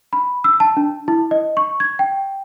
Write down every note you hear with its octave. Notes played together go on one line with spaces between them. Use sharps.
B5
E6
A5
D4
E4
D#5
C#6
G#6
G5